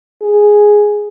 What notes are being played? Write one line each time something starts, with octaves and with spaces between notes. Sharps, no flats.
G#4